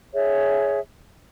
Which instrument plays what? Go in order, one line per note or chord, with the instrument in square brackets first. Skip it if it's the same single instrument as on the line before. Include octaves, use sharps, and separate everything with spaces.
[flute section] G#4 C#5 E5